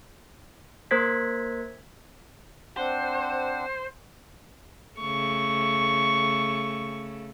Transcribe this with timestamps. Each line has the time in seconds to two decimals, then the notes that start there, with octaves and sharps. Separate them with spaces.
0.91 A#3 A#4 C5 G#6 B6
2.77 C4 D4 C5 F#5
5.00 C#3 A3 C#6